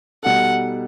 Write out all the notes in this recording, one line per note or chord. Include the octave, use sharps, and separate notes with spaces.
B2 G3 D#4 A4 F#5